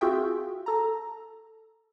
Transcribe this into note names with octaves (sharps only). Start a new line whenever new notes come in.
C4 F4 F#4 G#4 E5 G5
A4 A#5